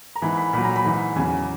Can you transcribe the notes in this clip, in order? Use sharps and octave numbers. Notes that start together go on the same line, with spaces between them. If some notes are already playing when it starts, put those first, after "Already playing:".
A#5
G#2 E3 B5
B5
A#2 F#3 B5
A#5
B5
G#2 E3
E2 C#3 F#3 G#5